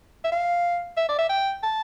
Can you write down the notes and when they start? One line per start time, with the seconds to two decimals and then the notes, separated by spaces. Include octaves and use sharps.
0.24 E5
0.32 F5
0.97 E5
1.08 D5
1.18 E5
1.29 G5
1.63 A5